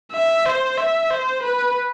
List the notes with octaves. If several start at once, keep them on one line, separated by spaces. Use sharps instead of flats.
E5
C5
E5
C5
B4